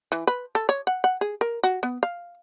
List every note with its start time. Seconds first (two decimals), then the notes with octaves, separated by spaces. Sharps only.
0.12 E3
0.27 B4
0.55 A4
0.69 C#5
0.87 F#5
1.04 F#5
1.21 G#4
1.41 A#4
1.63 F#4
1.83 B3
2.03 F5